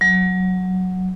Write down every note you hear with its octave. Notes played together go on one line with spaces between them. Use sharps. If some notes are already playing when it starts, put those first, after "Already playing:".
F#3